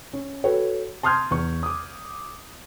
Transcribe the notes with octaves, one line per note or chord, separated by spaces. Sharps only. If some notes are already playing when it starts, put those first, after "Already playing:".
C#4
F#4 A4 B4 C#5 G5
A5 C6 D#6 F6 G6 G#6
E2 C#6
D6 D#6